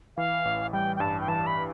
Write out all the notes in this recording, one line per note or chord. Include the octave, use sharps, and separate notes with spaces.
E3 F5
A1
G3 G5
G5
G2 A5
G5
E3 A5
B5